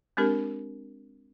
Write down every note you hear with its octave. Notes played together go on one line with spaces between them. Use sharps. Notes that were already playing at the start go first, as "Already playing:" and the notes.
G#3 C4 D4 G4 A#4